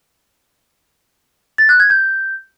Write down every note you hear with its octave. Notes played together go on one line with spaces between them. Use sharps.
A6
F#6
G#6
G6